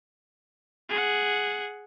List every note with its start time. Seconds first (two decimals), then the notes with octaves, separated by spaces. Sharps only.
0.90 G#4 F#5